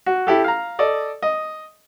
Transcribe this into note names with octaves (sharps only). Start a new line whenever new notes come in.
F#4
E4 G4 A4
F5 A#5
A4 D5 D#5
D#5